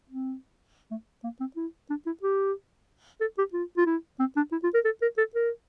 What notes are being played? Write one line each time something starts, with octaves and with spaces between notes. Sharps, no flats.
C4
A3
A#3
C4
E4
D4
E4
G4
A4
G4
F4
F4
E4
C4
D4
E4
F4
A#4
A4
A#4
A4
A#4